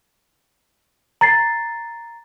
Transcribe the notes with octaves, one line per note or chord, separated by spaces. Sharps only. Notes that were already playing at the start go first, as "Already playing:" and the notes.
A#5 A6 C7